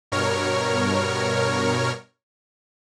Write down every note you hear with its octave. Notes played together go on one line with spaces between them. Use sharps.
G2 B2 A#4 C#5 F6